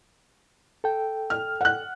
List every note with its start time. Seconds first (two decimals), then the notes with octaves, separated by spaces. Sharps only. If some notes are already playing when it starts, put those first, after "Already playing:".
0.84 A4 G5
1.30 F6
1.61 F#5 F#6